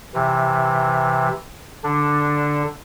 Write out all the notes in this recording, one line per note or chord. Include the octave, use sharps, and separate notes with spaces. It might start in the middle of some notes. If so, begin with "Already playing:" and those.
C3 E3
D3 D4